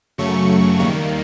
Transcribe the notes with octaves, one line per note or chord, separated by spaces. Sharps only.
F#2 C#3 F#3 A3 C#6
D#2 D#3 G3 A#3 C#6